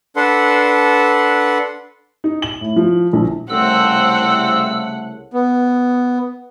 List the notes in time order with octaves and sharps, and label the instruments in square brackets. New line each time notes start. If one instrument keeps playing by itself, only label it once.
[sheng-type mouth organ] D4 A4 B4 F#5 C6
[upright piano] D#4
F#7
A2
F3
A#1
[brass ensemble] C2 C#3 A3 [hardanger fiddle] C4 [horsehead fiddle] F#5 [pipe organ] E6
[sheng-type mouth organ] B3